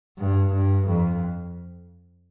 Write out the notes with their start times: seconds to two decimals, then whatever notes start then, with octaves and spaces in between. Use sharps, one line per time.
0.18 G2
0.53 G2
0.87 F2